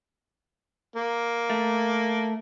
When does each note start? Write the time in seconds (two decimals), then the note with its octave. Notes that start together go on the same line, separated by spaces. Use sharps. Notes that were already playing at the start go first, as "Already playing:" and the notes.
0.96 A#3
1.50 A3